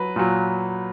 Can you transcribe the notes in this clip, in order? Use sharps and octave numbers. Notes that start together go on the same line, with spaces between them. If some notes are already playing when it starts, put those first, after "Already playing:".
Already playing: F#3 B4
A#2 F#3